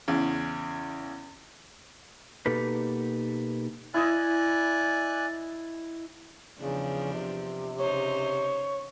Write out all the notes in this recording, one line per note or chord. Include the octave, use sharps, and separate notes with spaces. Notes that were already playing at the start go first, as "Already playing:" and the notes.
E2 C#3
B2 A#3 D#4 G4 A4 B4
E4 D5 D#5 G#5 F#6
E2 C#3 F3 D4
C3
C#3 D#4 C5 C#5